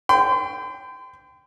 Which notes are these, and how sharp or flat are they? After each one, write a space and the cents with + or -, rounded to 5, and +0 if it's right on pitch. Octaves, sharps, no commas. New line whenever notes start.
G5 +0 C6 -45